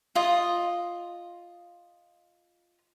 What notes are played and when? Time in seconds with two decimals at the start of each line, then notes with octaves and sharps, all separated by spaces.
0.15 F4 D#5